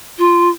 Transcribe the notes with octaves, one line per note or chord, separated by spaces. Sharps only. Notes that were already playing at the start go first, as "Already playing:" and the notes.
F4